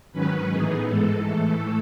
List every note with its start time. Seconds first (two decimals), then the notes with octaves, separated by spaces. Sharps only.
0.12 G#2 D#3 F#3 C#4 B4
0.49 A2 E3 B3 D#4 G#4
0.87 G#2 E3 G#3 A4
1.24 A2 E3 A3 A4